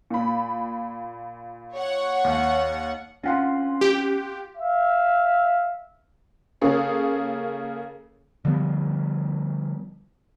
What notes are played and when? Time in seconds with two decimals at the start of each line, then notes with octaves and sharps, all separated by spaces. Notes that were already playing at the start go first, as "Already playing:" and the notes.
0.10 A#2 B5
1.74 C#5 F#5
2.24 D#2
3.23 C4 C#4 F4 F#5 C6
3.81 G4
4.57 E5 F5
6.61 C#3 A#3 G#4 A4 C#5
8.45 D3 F3 G3 B3